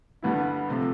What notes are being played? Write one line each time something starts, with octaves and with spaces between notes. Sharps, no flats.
G2 D3 G3 B3 E4
C3 F3 A3